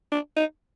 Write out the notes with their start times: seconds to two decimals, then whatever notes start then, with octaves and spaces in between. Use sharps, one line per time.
0.12 D4
0.37 D#4